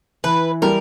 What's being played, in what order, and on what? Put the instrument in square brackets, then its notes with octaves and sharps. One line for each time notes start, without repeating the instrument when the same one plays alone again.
[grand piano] E3 [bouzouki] B4
[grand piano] G3 [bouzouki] A#4